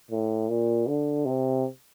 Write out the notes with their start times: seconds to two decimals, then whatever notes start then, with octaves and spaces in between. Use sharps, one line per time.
0.11 A2
0.49 A#2
0.87 D3
1.25 C3